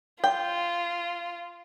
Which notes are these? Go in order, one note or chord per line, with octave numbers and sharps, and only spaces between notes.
F4 G5